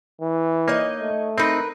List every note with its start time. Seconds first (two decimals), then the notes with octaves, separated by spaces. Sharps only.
0.21 E3
0.68 A#3 D#4 C#5 D#5
1.00 A3
1.38 C4 D#4 A#4 B4